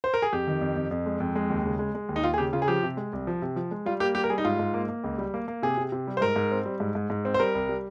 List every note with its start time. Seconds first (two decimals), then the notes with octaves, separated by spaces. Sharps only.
0.04 C5
0.14 A#4
0.22 G#4
0.33 F2 G4
0.47 D#3
0.61 F2
0.76 F2
0.91 F2
1.06 G#3
1.20 F2
1.36 G#3
1.50 D#2
1.65 C#3
1.79 G#3
1.95 G#3
2.09 D#2
2.16 D#4
2.23 D#2 F4
2.34 G#4
2.38 C#3 G4
2.53 C#3 F4
2.62 G#4
2.68 F3 G4
2.83 C3
2.97 G#3
3.13 C2
3.27 F3
3.42 C3
3.56 F3
3.71 G#3
3.86 G3 F4
4.00 A#3 G4
4.15 G3 G4
4.24 A#4
4.30 G3 G#4
4.38 D#4
4.45 G#2 F4
4.59 G#2
4.74 A#3
4.89 A#3
5.04 C#2
5.18 G3
5.34 A#3
5.48 A#3
5.63 C3 G#4
5.77 C3
5.92 C3
6.07 G3
6.17 C5
6.21 G#2 A#4
6.36 G#2
6.52 C4
6.66 G3
6.80 G#2
6.95 G#2
7.10 G#2
7.25 C4
7.34 C5
7.40 G3 A#4
7.55 C2
7.69 G3